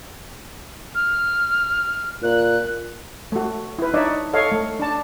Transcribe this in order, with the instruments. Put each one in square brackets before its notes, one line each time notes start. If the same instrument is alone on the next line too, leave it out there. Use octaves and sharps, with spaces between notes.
[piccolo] F6
[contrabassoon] A#2 [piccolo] F#6
[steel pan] A3 F#4
E4 B4
D4 D#4 C#5 D5 E5
A4 C#5 D#5 F5
A3
D4 A5